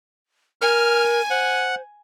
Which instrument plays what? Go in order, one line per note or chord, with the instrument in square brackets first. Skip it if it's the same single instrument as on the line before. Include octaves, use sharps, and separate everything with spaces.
[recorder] A#4 [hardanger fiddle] G#5 [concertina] F6
[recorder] C5 [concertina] F#5